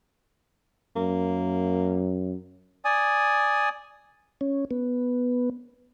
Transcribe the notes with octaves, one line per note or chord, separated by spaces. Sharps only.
F#2 A#3
D5 G#5 D#6
C#4
B3